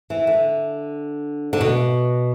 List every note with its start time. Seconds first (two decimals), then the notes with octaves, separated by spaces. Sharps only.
0.10 E3
0.27 D3
1.53 D3
1.61 B2